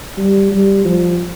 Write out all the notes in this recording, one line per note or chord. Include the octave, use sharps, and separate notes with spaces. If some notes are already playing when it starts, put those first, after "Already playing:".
G3
G3
F3